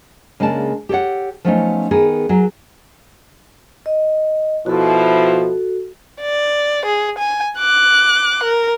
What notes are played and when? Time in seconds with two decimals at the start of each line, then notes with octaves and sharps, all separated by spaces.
0.40 C#3 G#3 A#3 D4 A5
0.89 G4 A4 C#5 F#5
1.45 F3 F#3 A3 B3 C#4 D#4
1.91 D#3 B3 G#4 A#4
2.29 F#3 G#4 A#4
3.86 D#5
4.66 B2 F3 E4 F#4 A4
6.20 D5
6.85 G#4
7.18 G#5
7.58 D6 F#6
8.43 A#4